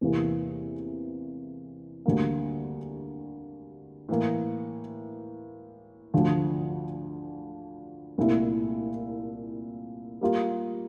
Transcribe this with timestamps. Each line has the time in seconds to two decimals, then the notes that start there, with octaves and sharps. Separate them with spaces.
0.01 E2 C3 E3 A#3
2.06 D2 D3 G3 A#3
4.09 A2 E3 A#3
6.14 D2 D3 F3
8.18 C2 A#2 A3 E4
10.21 G3 A#3 F4